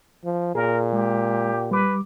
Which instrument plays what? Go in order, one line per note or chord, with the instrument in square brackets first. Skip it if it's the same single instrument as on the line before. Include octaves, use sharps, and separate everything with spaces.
[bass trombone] F3
[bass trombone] A#2 [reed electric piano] G#4 [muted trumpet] A#4
[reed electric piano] G#3 [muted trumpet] G4
[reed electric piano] G3 D6 [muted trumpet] B4